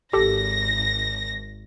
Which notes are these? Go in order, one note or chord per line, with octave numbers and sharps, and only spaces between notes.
G#1 G4 A4 A#6